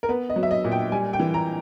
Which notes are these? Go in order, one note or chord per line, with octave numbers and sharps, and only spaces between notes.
A#4
B3 B4
D#5
F#3
E5
D#5
A#2
G5
G3 G#5
G5
E3
A#5